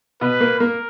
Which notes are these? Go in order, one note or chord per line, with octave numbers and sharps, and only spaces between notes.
B2 B4
A#3
A#3 A#4